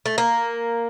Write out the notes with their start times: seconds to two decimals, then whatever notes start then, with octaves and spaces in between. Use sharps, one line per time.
0.06 A3
0.18 A#3